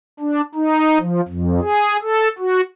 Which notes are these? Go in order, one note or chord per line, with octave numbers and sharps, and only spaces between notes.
D4
D#4
F3
F2
G#4
A4
F#4